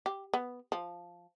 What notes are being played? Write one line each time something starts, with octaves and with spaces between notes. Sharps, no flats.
G4
B3
F3